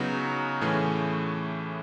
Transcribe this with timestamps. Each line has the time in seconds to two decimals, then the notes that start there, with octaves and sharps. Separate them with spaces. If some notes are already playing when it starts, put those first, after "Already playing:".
Already playing: C#3 F#3 B3 D#4 F#4
0.61 A2 E3 A3 C#4 G#4